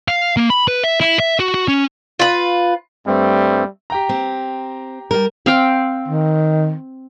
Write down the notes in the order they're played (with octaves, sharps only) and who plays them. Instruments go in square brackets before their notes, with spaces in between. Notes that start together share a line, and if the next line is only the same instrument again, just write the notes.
[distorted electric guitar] F5
A#3
B5
B4
E5
E4
E5
F#4
F#4
C#4
[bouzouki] F4 B4
[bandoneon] G2 A3 C4 [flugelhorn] G3
[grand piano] G4 G5 A#5
[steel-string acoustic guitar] C4
G3 A#4
[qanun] C4 F5 G5
[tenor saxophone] D#3